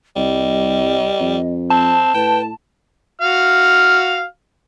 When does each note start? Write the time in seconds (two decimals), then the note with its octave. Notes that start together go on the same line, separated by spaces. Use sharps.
0.16 C2 G3 D#5
1.20 F2
1.70 C4 A5
2.15 A2 B4 G5
3.21 F#4 F5 F6